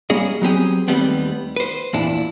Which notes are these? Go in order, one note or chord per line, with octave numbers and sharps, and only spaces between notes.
G3 A#3 C#4 G#4 D#5
F#3 B3 C4 G4 G#4
D#2 G3 A3 B3 C4
B4 C5
E2 A#2 D4 E4